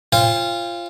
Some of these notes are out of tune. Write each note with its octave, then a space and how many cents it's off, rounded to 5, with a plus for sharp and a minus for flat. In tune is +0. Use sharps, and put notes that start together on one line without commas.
F4 -15 C5 +40 G5 +45